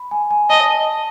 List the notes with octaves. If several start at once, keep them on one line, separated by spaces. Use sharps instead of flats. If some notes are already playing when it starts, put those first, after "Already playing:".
Already playing: B5
G#5
G#5
D#5 A5